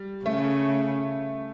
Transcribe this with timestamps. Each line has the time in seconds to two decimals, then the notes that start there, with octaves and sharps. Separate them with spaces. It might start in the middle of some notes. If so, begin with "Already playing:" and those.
Already playing: G3
0.25 C#3 A3